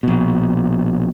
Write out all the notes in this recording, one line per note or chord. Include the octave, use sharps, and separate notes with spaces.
A#1 B2